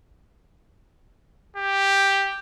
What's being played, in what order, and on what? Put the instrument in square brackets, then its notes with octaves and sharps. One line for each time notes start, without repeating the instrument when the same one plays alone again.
[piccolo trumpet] G4